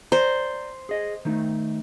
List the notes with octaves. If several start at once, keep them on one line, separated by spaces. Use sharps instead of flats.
C5 D5 A#5
G#4 D#5
D#3 A3 D#4